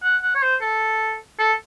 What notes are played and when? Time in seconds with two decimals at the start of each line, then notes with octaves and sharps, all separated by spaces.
0.03 F#5
0.23 F#5
0.35 C#5
0.42 C5
0.62 A4
1.40 A4